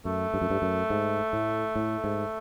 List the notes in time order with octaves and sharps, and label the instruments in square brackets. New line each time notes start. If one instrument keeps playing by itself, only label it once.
[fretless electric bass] F#2 [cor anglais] A3
[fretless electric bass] G2
F#2
G2
F#2
G#2
A2
A2
G#2